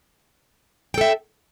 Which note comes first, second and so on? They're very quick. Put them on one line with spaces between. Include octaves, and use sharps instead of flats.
G5 A4 E5